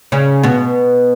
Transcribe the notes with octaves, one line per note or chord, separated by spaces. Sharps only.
C#3 C#4
B2 B3